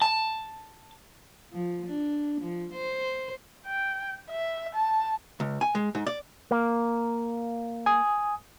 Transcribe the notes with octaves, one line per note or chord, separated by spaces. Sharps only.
A5
F3
D4
F3
C5
G5
E5
A5
C#2
G#5
G#3
G#2
D5
A#3
G#5 D#6